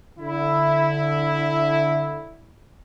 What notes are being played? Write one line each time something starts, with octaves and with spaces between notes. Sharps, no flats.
D3 E4